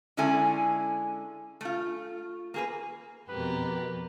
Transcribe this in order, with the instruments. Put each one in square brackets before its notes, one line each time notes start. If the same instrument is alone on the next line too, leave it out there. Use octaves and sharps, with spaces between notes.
[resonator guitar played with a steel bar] D3 G#3 C#4 E4 A4 G#5
A3 F4
A#3 G#4 B4
[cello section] F2 B2 [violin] G4 A#4 [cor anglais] B4